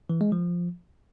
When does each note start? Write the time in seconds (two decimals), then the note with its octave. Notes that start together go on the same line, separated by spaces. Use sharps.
0.10 E3
0.21 G#3
0.32 F3